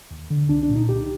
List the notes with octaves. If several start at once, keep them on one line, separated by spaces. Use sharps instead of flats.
D#2
D3
C2 D4
D4
A#2
D#4
C2 G4